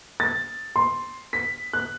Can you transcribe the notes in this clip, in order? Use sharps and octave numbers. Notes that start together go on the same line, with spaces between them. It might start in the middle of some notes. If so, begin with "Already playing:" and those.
A6
C6
B6
F#6